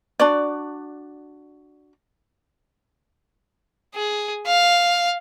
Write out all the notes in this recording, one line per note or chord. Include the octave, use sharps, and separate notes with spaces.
D4 F#4 D5
G#4
F5